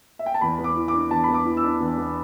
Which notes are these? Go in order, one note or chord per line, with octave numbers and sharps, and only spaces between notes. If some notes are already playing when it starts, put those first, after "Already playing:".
E5
G5
A5
E2 B5
B3
D6
E3
D6
D4
E2 A5
B3 B5
D6
E3
E6
D4
E2
B3